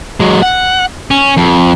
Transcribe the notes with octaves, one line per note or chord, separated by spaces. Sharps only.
F#3 G#3
F#5
C#4
F2